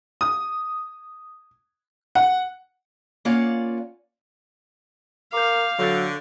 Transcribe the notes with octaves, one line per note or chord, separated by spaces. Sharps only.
D#6
F#5
A#3 C#4 F4 D5 F#5
A#4 F5 D6 G6
D3 F#3 C#6 G6 A6